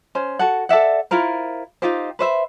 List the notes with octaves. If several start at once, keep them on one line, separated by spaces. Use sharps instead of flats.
C#4 C5
F#4 A4 F#5
A4 D5 E5 F#5
E4 F4 A#4 C5
D#4 F4 G4 C5
B4 C5 E5